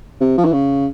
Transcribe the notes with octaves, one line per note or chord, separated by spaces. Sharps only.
C3
F3
E3
C#3